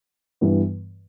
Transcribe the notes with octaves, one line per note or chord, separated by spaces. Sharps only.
G2 E3 B3